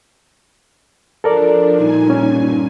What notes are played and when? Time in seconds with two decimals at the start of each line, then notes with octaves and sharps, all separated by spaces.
1.24 F3 D4 A4 A#4 D5
1.77 G2 A#2 D#4 G#5
2.10 C#4